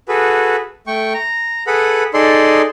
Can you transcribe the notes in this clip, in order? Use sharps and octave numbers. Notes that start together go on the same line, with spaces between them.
F#4 G#4 A4 B4
A3 G5 C#6
A#5
G#4 A4 B4 F#5 B5
D#4 G#4 A4 D5 C6